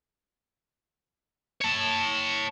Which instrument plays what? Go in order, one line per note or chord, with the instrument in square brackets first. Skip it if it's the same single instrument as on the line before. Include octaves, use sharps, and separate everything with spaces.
[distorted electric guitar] C#5 A5